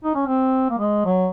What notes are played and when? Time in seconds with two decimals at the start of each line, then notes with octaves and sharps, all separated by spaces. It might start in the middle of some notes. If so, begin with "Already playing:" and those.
0.04 D#4
0.15 C#4
0.26 C4
0.70 A#3
0.78 G#3
1.05 F#3